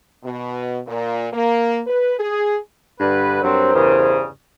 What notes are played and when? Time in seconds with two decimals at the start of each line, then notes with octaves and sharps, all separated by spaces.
0.24 B2
0.87 A#2
1.33 A#3
1.87 B4
2.19 G#4
3.00 G2 D3 B4
3.43 G2 F#3 C4 A#4 C5
3.74 E2 G2 C#3